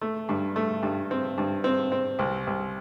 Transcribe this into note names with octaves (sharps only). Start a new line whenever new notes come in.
A3
G2
A3
G2
C4
G2
C4
C4
C2
C2